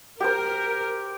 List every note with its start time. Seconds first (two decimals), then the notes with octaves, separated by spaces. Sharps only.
0.20 G4 A#4 C5